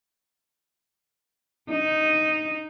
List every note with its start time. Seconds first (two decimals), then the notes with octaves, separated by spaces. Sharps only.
1.70 D#4